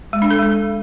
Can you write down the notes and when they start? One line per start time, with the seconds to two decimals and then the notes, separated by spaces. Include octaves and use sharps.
0.13 G#3
0.22 D4
0.31 A4
0.39 G#3